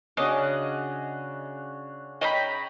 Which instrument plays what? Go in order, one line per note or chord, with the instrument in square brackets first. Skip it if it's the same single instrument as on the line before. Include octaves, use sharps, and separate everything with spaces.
[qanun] C#3 D6 [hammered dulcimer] C#4 D4 F#4 [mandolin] D#5
[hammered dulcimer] C#5 G5 [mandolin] D#5 A#5 B5